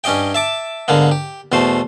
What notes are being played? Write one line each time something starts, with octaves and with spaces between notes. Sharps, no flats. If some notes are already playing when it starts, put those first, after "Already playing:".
G2 C#4 G4 D#5 G5
E5 A5 D6
G#2 D3 A#3 B3
G4
E2 B2 A3 C5